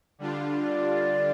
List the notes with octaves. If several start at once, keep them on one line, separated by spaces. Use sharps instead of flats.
D3 G3 D4 F4
D5